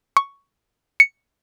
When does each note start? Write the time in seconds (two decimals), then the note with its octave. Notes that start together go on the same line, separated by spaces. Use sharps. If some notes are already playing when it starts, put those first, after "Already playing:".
0.17 C#6
1.00 C#7